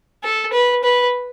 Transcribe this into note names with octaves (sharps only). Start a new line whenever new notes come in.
A4
B4
B4